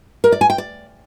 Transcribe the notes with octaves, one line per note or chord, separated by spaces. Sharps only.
A#4
D5
G#5
G5
D5